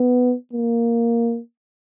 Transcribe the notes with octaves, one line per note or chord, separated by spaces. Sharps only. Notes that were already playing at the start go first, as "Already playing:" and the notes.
Already playing: B3
A#3